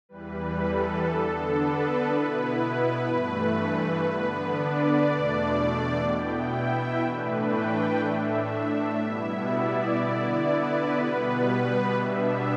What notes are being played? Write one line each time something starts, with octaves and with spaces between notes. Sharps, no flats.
E2 E3 G3 B4
A4
D3 B3 D4
B4
B2 B3 E4 B4
B4
G2 E3 A3 B4
D3 B3 D4
D5
E2 B2 A3 D4
B2 B3 E4 G5
E5
A2 E3 A3 D4 B4
G5
A2 A3 D4 E5
B2 G3 B3 E4
D5
D3 B3 E4
B4
B2 G3 B3 B4
B4
B2 G3 B3 D4 E5